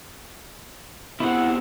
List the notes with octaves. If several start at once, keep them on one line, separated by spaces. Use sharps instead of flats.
B2 C4 E4 F#5